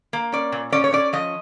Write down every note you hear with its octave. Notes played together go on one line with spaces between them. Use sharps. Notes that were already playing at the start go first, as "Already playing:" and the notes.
A#3
C#4 D5
A#2
C#4 D5
C#5
C#4 D5
F3 D#5